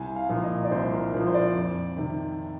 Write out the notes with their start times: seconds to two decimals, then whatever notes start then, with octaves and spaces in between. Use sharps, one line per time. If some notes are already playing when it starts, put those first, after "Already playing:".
Already playing: C2 G#5
0.16 F5
0.29 A#2 F3
0.44 D#5
0.64 D5
0.71 C2 C5
0.93 A#4
1.14 A#2 F3 C5
1.27 C5
1.34 D5
1.56 F2
1.97 C3 D#3